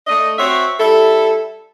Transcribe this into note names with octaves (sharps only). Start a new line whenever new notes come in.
A3 D4 D#5
C4 F#4 C5 C#5 E5
G3 E4 A4